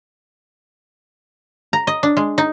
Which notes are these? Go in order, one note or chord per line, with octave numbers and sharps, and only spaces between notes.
A#5
D#5
D4
G#3
D#4